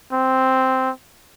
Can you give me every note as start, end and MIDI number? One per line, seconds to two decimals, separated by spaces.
0.13 0.91 60